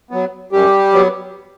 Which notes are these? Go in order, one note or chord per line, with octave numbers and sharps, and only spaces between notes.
F#3 B3
F#2 G3 G4
F#3 B3